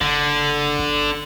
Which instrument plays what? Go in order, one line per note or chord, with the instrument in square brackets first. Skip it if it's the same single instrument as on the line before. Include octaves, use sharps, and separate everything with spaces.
[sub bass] F#1 [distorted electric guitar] D3
[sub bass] G1